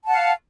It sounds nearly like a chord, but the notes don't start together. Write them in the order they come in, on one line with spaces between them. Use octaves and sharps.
A5 F#5 F5